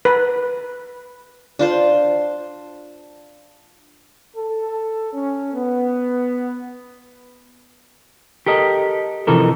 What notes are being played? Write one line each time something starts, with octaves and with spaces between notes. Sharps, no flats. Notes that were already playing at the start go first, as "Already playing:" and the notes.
B4
D4 F4 C5
A4
C#4
B3
G4 A4 A#4 D#5
C3 E3 F3 D#4 A4 A#4